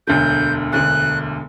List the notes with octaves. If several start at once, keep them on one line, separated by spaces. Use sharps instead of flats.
E1 D2 D3 G6
E1 D2 D3 F#6